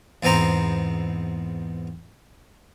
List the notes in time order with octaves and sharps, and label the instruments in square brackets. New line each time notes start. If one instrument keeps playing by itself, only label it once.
[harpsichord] E2 G#2 B3 C4 A#5 C6